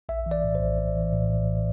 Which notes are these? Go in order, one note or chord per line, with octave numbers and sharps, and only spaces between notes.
A#1 E5
E3
D5
A2
C5
A#1
A#1
E3
A2
A#1